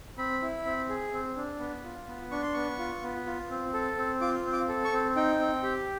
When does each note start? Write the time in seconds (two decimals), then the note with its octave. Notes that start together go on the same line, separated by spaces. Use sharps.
0.18 C4 B5
0.42 E4
0.65 C4
0.89 G#4
1.12 C4
1.37 D4
1.60 B3
1.84 F4
2.07 B3
2.31 D4 C#6
2.42 C6
2.53 B3 C#6
2.78 F4
3.03 B3
3.26 F4
3.50 C4
3.74 A4
3.97 C4
4.21 F4 D6
4.45 C4
4.53 D6
4.69 A4
4.84 C#6
4.93 C4
5.16 D#4 G5
5.40 C4
5.63 G4